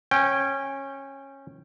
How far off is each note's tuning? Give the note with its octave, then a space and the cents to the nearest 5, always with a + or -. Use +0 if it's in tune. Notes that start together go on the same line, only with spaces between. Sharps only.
C#4 -20 G5 +0